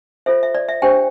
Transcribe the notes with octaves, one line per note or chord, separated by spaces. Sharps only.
F4 A4 C5 E5
E5
D5
E5
D4 G4 C5 G5